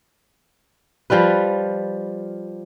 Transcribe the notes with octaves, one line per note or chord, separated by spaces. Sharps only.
F3 G3 F4 B4